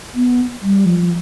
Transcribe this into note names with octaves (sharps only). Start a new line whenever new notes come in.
B3
G3
F3